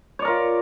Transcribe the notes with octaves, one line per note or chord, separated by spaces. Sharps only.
F4 A#4 C#5 D5